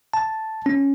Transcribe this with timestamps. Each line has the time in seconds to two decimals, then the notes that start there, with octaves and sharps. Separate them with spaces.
0.14 A5
0.66 C#4